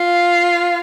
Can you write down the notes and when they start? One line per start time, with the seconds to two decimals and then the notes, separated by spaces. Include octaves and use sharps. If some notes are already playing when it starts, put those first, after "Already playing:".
Already playing: F4